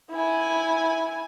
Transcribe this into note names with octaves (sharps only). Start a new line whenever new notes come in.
E4 G#5